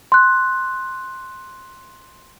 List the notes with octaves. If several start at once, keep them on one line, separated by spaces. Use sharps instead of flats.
C6 F#6